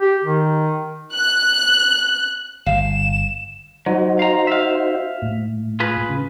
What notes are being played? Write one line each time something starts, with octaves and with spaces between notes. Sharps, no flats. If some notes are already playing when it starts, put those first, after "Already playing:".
G4
D#3
F#6
G1 F5 E7
F#3 D#4 F#4 C5
F5 A#5
E5 F5
A2
F4 G#4 B4
C#3